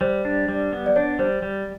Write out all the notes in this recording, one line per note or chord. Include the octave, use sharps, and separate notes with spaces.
G3 C5
D4
G3
B3
D5
D4 C#5
G3 C5
G3